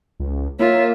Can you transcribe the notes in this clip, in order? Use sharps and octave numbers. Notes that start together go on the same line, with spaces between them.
C#2
A#3 F4 C#5 E5